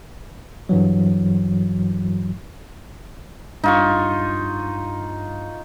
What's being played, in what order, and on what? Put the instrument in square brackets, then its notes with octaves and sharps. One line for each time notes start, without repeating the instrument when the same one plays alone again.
[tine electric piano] G2 E3 F#3
[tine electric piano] G2 [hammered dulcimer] D#4 F4 C#6